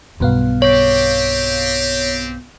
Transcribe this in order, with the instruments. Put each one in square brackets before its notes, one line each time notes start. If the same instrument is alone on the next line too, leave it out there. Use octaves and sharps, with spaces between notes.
[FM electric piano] B1 B3 F5 [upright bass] G2 B2
[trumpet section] C4 G4 [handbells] C#5